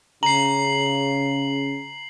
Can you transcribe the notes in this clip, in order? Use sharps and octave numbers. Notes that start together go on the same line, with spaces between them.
C#3 A#5 C7 F#7